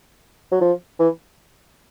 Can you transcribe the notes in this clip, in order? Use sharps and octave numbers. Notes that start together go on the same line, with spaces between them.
F#3
F3
E3